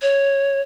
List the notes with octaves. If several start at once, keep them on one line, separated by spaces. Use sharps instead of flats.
C#5